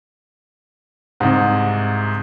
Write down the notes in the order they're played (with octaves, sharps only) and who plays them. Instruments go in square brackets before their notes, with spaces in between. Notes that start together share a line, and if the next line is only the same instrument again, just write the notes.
[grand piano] C2 G#2